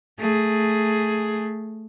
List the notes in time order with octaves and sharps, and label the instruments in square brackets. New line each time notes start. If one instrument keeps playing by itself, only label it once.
[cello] A3 G#4